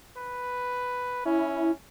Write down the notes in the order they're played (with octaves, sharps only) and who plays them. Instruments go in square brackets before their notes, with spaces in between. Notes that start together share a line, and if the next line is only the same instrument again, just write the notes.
[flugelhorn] B4
[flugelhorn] C#4 [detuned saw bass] E4